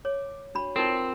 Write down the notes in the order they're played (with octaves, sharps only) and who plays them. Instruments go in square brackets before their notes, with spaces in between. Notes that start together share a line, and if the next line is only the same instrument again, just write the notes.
[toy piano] C#5 [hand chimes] D6
[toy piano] D4 B5 [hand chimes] F#4 C#5
[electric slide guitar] C4 [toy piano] D#4 A4 [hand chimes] F4 A#4